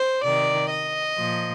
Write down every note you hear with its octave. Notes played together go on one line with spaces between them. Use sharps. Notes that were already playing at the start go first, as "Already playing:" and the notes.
Already playing: C5
C3 D#3 D5
D#5
A#2 F3